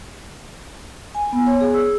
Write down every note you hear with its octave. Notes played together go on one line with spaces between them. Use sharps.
G#5
B3
C#5
G#4
E6